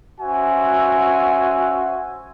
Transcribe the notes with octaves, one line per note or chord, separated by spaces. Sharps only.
C#4 F#4 C5 E5 F#5 G#5